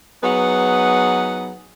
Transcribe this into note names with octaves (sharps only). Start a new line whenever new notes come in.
F#3 B3 D#4 G#4 B4 F#5